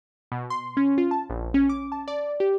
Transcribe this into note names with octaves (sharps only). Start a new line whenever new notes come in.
B2
C6
C#4
F4
A5
A#1
C#4
D6
A5
D5
G4